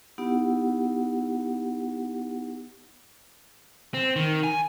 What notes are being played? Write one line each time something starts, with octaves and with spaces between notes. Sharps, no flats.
B3 D#4 E4 G4 F#5
C4
D#3
G#5